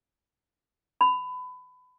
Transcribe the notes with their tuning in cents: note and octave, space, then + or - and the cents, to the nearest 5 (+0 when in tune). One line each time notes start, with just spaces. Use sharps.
B5 +25